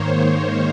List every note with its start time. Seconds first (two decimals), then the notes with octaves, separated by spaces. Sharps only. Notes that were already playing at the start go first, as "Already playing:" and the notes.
Already playing: G#2 D#3 A#3 C5 C#5
0.12 C#5